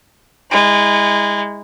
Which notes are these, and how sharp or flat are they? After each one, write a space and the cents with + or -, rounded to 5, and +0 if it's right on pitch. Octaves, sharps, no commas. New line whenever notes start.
G#3 -25 E4 -35